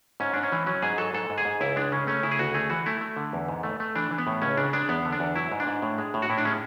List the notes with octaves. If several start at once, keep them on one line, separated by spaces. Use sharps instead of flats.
G#2 C#4
G#2 D4
C#4
E3
F#3 C#4
G#2 G#4
F#3 A4
G#2 A4
G#2
G#4
G#2
C#2 E4
G#3 D4
C#3 C#4
A3 C#4
C#3 E4
G#4
D2 F#4
A3 G#4
E3 F#4
A3 E4
A3
D3
E2
G#2
A3
A3
E3 D4
E3
B3
A2
C#2 C#4
C#3 D4
G#3 D4
E2 B3
D3
D4
E2
F#3 E4
G#2
D4
G#2
A2
G#3
A2
F#4
A2 E4
D4
G#3 C#4